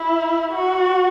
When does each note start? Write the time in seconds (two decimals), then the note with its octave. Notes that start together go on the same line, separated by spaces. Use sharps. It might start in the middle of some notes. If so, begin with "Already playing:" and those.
Already playing: E4
0.52 F#4